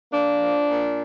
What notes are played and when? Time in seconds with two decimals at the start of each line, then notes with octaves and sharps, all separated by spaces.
0.11 A#3 D4
0.40 F3
0.68 A#2